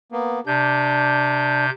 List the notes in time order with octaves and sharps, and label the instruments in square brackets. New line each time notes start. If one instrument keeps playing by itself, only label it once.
[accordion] A#3 B3
[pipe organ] C3 G6 [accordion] D4